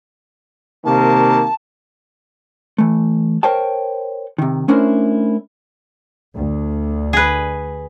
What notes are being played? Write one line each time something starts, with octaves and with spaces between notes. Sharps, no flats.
C3 D#3 A#3 A5
E3 A3
A#4 C5 C#5 G5 A5
C3 D#3
A3 C#4 D4 E4 A#4 C5
D2
G#4 B4